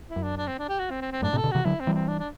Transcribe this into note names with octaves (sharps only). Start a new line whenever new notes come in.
E4
F#2
D4
D4
C4
D4
G4
F#4
C4
C4
C4
F#2 A2 D4
A2 C3
A4
B2 D3
C3 E3 F#4
D3 F#3 E4
C4
E3 G3
C4
D4
D4